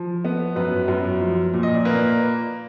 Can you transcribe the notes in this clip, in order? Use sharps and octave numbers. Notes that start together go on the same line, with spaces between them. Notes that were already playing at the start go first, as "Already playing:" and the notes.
Already playing: F3
B3
F#2 B4
F#2
F3
A#2
D#5
D5
A#3 B4